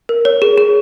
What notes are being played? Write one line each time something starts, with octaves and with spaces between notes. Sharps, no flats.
A#4
C#5
G#4
G#4